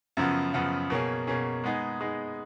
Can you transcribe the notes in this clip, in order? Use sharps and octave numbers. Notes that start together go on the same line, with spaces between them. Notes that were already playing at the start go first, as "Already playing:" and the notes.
F#2 C#3 F3 B3
F#2 C#3 F3 B3
B2 A#3 C#4 G#4
B2 A#3 C#4 G#4
G#3 B3 D#4 G#4
G#3 B3 D#4 G#4